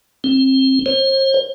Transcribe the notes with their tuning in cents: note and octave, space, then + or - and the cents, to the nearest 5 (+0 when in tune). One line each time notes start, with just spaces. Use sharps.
C4 +25
C5 +40